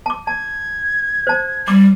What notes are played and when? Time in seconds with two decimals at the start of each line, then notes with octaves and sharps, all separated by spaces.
0.06 A5 D6
0.27 A5 G#6
1.27 C5 A5
1.68 G3 D6